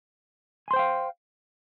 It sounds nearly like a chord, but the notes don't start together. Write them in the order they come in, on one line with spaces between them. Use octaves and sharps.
G#5 C6 C5 G5 F5